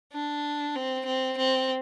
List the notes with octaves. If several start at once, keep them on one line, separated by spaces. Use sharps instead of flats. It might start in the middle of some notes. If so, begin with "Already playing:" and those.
D4
C4
C4
C4